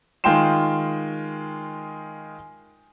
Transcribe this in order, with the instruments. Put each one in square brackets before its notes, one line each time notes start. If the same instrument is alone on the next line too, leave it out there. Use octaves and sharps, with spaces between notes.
[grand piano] D#3 G#3 F4 G5 C6 E7